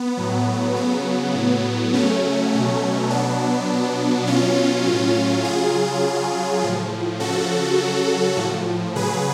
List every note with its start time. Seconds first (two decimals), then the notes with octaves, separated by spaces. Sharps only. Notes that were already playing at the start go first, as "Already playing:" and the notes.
Already playing: B3
0.17 A2 F#3
0.76 C#3 F#3 B3
1.35 A2 F#3
1.93 C#3 F#3 A3 C#4
2.52 B2 F#3
3.10 B2 F#3 B3 D4
3.69 B2 F#3
4.27 B2 F#3 C#4 F4
4.86 A2 F#3
5.44 C#3 F#3 F4 G#4
6.03 C#3 F#3
6.62 A2 F3
7.20 C#3 F3 F#4 A4
7.79 C#3 F#3
8.37 A2 F3
8.95 C#3 F#3 G#4 B4